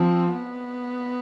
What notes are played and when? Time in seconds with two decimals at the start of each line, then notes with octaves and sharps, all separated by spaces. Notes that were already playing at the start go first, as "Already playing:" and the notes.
Already playing: F3 C4
0.33 B3